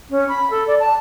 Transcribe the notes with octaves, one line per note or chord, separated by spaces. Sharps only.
C#4
B5
A4
D5
A5